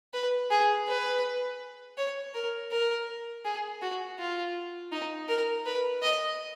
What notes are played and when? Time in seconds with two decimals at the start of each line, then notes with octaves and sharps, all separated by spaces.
0.13 B4
0.51 G#4
0.87 B4
1.97 C#5
2.34 A#4
2.71 A#4
3.45 G#4
3.82 F#4
4.18 F4
4.92 D#4
5.29 A#4
5.65 B4
6.02 D#5